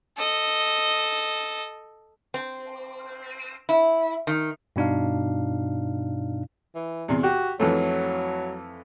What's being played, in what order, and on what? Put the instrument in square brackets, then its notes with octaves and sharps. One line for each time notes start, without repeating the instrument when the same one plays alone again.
[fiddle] A4 D#5
[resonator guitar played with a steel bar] C4
E4
D#3
[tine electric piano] G2 B2 D4 D#4 F5
[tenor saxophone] E3
[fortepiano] E2 C3
[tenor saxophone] F#4 [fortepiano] G4
[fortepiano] F2 E3 A3 [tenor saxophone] F#3